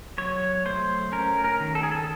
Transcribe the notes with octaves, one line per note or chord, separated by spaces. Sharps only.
F#3 C#5
A3 C5
C#4 A#4
A#4
D#3
A4
G#4
A4